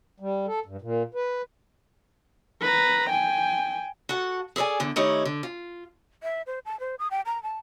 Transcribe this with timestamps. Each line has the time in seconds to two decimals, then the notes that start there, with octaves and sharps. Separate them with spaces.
0.20 G3
0.47 A4
0.66 G2
0.82 A#2
1.15 B4
2.61 B4 A#5
3.10 G5 G#5
4.09 F#4 A4 F#5
4.56 G#4 A4 B4 D5 G#5
4.80 E2 D3
4.96 D#3 A3 D#4 E4 G4 C#5
5.25 D3
5.43 F4
6.23 E5
6.47 C5
6.65 A5
6.80 C5
6.99 D#6
7.11 G5
7.26 A#5
7.43 A5